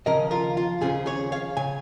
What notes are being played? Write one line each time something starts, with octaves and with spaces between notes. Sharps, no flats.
D#2 C#3 F3 C#4 A#4 D#5
F4 A#4
F4
D#2 C#3 F3 C#4 G#4
G#4 C#5
C#5 F5
C#3 G#5